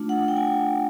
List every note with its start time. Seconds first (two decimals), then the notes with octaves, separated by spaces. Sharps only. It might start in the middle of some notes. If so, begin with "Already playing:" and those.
Already playing: A3 D4 F4
0.09 F#5
0.28 G5
0.37 G#5